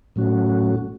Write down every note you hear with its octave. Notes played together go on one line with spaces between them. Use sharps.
A2 F#3 A3 C#4 F#4